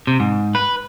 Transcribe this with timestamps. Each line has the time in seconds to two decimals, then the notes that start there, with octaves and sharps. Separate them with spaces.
0.07 C3
0.20 G#2
0.55 B4